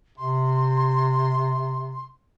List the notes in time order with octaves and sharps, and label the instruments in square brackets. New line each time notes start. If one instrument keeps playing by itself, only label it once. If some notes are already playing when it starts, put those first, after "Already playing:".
[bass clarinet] C3 [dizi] C6